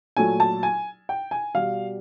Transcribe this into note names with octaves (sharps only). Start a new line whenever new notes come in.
A#2 F#3 A3 G#5
A5
G#5
G5
G#5
B2 G3 F5